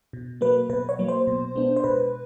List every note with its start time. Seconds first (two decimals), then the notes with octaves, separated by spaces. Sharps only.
0.13 B2
0.41 F#3 A#3 B4
0.70 B2 B4
0.89 C#5
0.99 F#3 A#3
1.08 C5
1.27 B2
1.55 G#3 B3 D4
1.76 C5
1.84 B2 B4